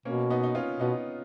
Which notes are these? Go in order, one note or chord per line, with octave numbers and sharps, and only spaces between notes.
B2 A#3 C#4
B3 D#4
D#4
C#4 F4
B2 B3 D#4